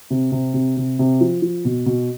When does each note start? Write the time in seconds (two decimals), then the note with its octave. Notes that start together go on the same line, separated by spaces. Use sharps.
0.10 C3
0.32 C3
0.54 C3
0.77 C3
0.99 C3
1.21 F3
1.42 F3
1.65 B2
1.86 B2